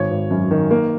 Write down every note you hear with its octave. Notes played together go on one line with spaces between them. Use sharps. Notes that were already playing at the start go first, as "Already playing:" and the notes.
Already playing: G#1 C#5
G#1
F#2
D#3
A#3